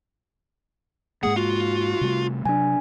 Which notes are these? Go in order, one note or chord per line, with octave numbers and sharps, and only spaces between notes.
G#2 G#3 A#3 G#4 F#5
F4 F#4
C3 G3 A3
C3 F#3 D4 G#5